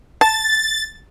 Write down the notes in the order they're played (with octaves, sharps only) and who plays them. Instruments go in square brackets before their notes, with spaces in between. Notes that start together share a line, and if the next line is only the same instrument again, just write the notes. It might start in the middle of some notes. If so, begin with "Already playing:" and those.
[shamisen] A5 [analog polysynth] A6